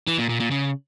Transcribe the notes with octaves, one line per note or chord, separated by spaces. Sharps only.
E3
A#2
A#2
A#2
C#3